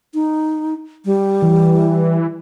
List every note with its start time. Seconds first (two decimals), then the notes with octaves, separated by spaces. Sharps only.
0.14 D#4
1.05 G3
1.42 E3